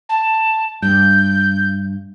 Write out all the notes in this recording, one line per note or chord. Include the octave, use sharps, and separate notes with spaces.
A5
G2 G6